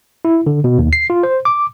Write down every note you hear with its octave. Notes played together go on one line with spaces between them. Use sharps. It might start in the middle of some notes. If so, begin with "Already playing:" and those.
E4
D3
B2
D#2
C7
F4
C5
D6